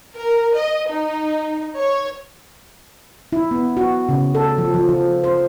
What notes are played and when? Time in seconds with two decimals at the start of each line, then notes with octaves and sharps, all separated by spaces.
0.15 A#4
0.54 D#5
0.89 D#4
1.79 C#5
3.33 E4
3.51 B3
3.77 F#4
4.09 C#3
4.35 A4
4.58 F3
4.74 F3
4.89 F3
5.24 C5